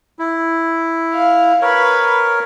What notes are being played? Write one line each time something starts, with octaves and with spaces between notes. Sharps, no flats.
E4
F5
A#4 B4 C#5